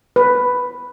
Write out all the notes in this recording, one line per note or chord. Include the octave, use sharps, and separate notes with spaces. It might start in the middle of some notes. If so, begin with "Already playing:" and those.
B4